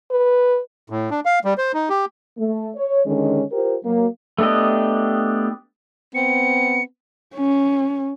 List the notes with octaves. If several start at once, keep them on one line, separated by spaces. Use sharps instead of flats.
B4
A2
D4
F5
G3
C5
D#4
G4
A3
C#5
D3 D#3 G#3 C#4
F4 G4 A#4 C5
F#3 A#3
A3 B3 D4 G4 D#5
B3 C4 C#7
C#4